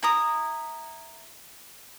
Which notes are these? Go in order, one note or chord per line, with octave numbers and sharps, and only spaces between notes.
E4 A#5 D#6